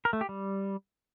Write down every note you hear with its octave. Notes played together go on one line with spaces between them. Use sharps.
A#4
A3
G4
G3